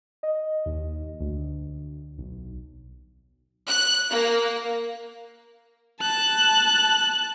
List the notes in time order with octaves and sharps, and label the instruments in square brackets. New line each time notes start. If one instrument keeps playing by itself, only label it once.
[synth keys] D#5
D#2
D2
B1
[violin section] F#6
A#3
[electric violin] A5 F#6